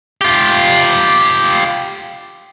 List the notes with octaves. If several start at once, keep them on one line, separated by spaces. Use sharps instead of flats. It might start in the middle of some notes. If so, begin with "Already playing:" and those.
F4 G4